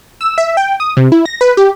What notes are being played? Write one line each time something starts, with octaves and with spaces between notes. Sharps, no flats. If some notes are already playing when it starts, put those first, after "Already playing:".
E6
E5
G5
D#6
C3
E4
A#6
B4
G4